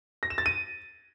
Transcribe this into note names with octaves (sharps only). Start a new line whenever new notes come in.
A#6
E7
A6
D#7